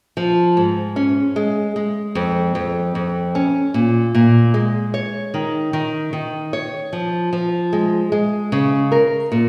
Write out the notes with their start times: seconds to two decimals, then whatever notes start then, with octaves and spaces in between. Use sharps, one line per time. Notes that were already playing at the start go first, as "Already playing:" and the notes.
0.17 F3
0.57 G#2
0.96 C#4
1.36 G#3
1.76 G#3
2.15 F2
2.55 F2
2.95 F2
3.35 C#4
3.74 A#2
4.15 A#2
4.54 G#3
4.94 C#5
5.34 D#3
5.73 D#3
6.13 D#3
6.53 C#5
6.93 F3
7.33 F3
7.73 G#3
8.12 G#3
8.52 C#3
8.92 A#4
9.32 A#2